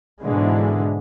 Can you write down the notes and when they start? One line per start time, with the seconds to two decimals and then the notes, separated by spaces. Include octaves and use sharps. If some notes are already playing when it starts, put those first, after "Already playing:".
0.21 G#2 B2 D3 E3 G#3